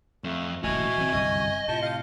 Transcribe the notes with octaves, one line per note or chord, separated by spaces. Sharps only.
F2 A3
D#1 A1 F#4 D#5 E5 G#5 C#6
E3 C4
G1 C2 F#2 D#5
A2 C3 F4 A5 G6
F5